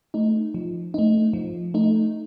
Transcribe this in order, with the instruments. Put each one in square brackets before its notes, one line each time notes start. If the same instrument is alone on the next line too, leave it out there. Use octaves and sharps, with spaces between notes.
[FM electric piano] A3 D#4
F3
A3 D#4
F3
A3 D#4